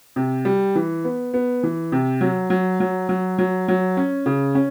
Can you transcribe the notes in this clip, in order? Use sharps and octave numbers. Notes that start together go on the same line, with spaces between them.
C3
G3
E3
B3
B3
E3
C3
F#3
F#3
F#3
F#3
F#3
F#3
C#4
C#3
C#4